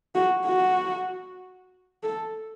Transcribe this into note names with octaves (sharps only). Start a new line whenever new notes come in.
F#4
F#4
A4